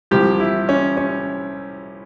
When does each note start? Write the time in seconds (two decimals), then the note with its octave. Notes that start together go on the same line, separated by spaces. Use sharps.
0.11 C2 C3 F3 G4
0.40 E4
0.69 C#4
0.97 C#4